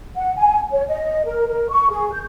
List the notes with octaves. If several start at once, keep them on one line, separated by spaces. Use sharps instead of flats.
F#5
G#5
C#5
D#5
A#4
A#4
C#6
G#4
G6